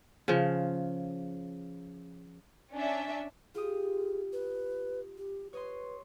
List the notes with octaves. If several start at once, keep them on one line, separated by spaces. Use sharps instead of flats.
C#3 F3
C#4 D4 E5
F4 G4 G#4 D#6
B4
G4
B4 C#5 D#5 C6